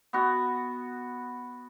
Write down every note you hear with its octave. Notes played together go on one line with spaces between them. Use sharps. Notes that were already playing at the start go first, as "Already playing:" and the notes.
B3 F#4